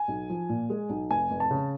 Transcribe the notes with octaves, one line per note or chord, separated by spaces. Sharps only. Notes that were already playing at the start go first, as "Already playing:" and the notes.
Already playing: G#5
B1
F3
A#2
G#3
B1
F1 G#5
F1
A5
C#3